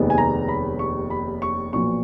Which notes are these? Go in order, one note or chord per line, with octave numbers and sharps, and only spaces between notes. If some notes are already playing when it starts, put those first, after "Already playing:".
Already playing: F1 D#2 D#3 G#3 B3
G#5
A#5
B5
C#6
B5
C#6
B1 A#2 F3 B3 C#6